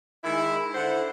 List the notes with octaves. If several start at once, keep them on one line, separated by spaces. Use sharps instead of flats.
D#3 G#3 E4
D3 E4 C5 F#5